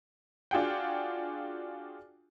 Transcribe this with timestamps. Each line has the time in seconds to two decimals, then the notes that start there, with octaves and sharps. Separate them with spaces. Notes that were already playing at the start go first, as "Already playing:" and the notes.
0.51 D4 F4 F#4 G#4 F#5 G5